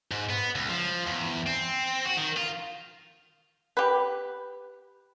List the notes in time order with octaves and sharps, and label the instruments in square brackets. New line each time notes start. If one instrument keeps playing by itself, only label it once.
[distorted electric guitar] G#2
B3
C#2
F3
E2
C4
F#4
D#3
F4
[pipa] G4 B4